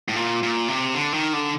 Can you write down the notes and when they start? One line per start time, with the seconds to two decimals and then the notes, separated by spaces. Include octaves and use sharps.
0.09 A2
0.16 A#2
0.43 A#2
0.68 C3
0.94 D3
1.14 D#3
1.33 D3